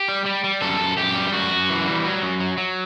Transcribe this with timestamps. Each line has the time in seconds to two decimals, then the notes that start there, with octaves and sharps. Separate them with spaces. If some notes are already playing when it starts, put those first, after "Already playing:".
Already playing: G4
0.09 G3
0.26 G3
0.44 G3
0.61 F#2 A4
0.80 F#2
0.97 F#2 G4
1.15 G3
1.33 F#2 F#4
1.51 F#2
1.69 E3
1.86 G3
2.05 F#3
2.22 F#2
2.40 F#3
2.57 F#3